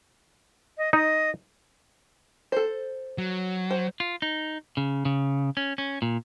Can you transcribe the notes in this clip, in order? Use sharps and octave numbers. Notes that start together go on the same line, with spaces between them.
D#5
D#4 D#5
A4 C5
F#3
C5
F4
D#4
C#3
C#3
C#4
C#4
A#2